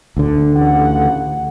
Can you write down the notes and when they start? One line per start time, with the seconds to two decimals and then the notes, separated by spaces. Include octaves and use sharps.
0.17 D2 D3
0.54 A1 C#3 F#5